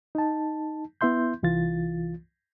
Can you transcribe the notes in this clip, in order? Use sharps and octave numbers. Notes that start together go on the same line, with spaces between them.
D#4 A5
B3 E4 E5 C6 G6
C2 E3 F4 A6